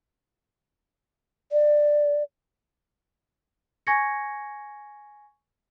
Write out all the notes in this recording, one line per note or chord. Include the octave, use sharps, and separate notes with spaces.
D5
G#5 C#6 G#6 A#6 C#7